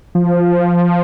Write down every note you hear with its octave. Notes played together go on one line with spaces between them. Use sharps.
F3